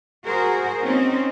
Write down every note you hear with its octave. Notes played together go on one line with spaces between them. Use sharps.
F#4 G#4 A#4 C5
C4 C#4 D#4